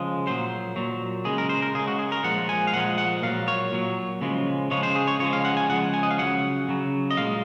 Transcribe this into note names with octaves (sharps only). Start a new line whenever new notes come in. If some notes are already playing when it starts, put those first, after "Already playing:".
Already playing: C#3 F3 G#3
A#2 F#3 C5
A#2 F#3
C#3 G#3 G#4
A#4
C5
A#4
C#3 G#3 G#4
F#4
G#4
A#4
A#2 F3 G#3 F#5
G#5
F5
A#2 F3 G#3 F#5
F#5
A#2 F#3 F5
C#5
A#2 F#3
C#3 F3 G#3
C#3 F3 G#3 C#5
C5
G#4
C#5
C#3 F3 G#3 C#5
F5
F#5
G#5
C#3 F3 G#3 F#5
G#5
D#5
F5
C#3 F#3 F#5
C#3 F#3
D#5
A#2 G#3 F5